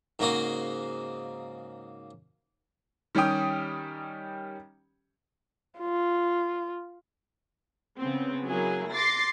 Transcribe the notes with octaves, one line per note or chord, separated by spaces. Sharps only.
G#2 C#3 A#3 F#4 D#5 F5
D#3 G3 C#4 G4 G5 D#6
F4
C#3 B3 C4
F#3 A#3 E4 G#4
C6 D6 A6 A#6 C7